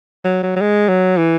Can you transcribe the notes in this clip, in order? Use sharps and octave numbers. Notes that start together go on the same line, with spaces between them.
F#3
F#3
F#3
G#3
F#3
E3